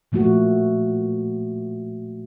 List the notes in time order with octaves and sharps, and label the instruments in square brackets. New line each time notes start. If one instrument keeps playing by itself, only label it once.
[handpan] A#2 F3 A3 A#3 F#4